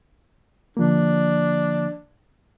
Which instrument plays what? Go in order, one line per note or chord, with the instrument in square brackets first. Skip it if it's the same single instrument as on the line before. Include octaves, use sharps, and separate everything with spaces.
[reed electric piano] D3 F3 A#3 [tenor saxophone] D4